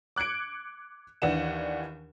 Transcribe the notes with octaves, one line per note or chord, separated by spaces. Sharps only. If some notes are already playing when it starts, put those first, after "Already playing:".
D6 F#6 G#6 C#7 D7
D#2 E3 D4 F#5 E7